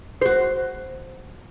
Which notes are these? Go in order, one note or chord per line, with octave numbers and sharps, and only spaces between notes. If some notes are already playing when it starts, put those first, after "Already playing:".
F#4 C5